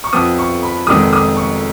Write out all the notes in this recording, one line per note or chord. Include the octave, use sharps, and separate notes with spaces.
C#6
F2 F3 B3 D#6
C#6
B5
F1 F2 D#3 G#3 B3 D#6
D#6
C#6